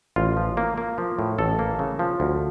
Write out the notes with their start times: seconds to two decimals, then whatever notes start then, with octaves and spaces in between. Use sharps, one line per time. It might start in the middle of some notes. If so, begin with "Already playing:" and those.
0.16 A1 F4
0.37 F3
0.57 A#3
0.78 A#3
0.98 F3
1.19 A2
1.39 A1 A4
1.59 A#3
1.79 C#3
1.99 F3
2.20 D2